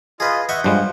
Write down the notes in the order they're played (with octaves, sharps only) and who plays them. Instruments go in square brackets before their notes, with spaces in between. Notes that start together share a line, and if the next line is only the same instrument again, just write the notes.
[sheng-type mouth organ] F4 D#5 [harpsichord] G#4 B4
[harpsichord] D#5 E5 C#6 [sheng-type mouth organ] F#5 G6
[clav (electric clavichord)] G2 G3 G#3 [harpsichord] F3